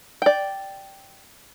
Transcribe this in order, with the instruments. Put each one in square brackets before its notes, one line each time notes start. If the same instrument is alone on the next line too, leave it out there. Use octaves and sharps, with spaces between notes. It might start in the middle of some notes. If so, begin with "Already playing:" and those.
[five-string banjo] D5 G5